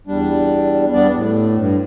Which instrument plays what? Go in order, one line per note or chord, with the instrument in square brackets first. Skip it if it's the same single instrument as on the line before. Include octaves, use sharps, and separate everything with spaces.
[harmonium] E2 G3 D4
G3 B3 D4 D5
A2
G2